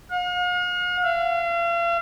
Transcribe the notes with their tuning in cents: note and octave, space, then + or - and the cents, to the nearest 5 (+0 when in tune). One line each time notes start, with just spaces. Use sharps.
F5 +45
F5 -40